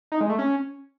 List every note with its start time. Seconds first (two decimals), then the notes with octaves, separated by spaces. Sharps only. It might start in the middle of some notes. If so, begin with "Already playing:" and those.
0.12 D#4
0.21 G#3
0.30 A3
0.39 C#4